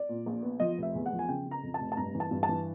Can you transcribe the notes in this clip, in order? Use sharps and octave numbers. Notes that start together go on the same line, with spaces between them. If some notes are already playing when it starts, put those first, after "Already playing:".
Already playing: D5
A#2
A#1
B3
F3 D#5
F1 E5
E2
F#5
F3
G#5
C#3 G5
C#3
A#5
F2
A5
F1
A5
G2 A#5
E3
A5
G2
A5
E3